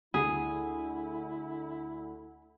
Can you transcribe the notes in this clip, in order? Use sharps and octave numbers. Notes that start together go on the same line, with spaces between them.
D2 E4 G#4